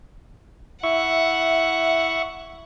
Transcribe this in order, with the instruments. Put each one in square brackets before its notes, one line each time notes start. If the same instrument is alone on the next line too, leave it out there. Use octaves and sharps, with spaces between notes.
[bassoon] E4 [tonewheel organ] E5 C#6 [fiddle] F#5